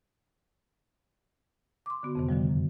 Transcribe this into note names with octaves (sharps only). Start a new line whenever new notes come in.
C6 D6
D3 B3 F#4
F2 C3 D#3
D3 D#3 F3 G3
F#2